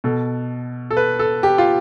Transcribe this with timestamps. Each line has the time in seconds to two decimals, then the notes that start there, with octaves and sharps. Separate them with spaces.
0.04 B2 A4
0.90 A4
0.97 B4
1.19 A4
1.43 G4
1.58 F4